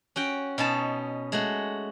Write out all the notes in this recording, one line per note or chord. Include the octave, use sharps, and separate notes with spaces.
C#4 F#4 G5
B2 C#4 D#4 A5
G#3 A3 F#4